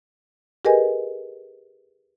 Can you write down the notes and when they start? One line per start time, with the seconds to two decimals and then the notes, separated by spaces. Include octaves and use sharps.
0.65 G4 G#4 A#4 B4 D#5 G#5